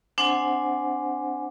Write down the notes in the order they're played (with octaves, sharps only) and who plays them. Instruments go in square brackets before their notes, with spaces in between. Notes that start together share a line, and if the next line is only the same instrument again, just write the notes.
[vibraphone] C4 D4 C5 F#5 G#5